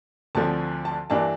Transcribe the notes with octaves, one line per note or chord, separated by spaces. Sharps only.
D2 D3 F3 C4 A5
A5
G2 E3 G3 A#3 D4 A5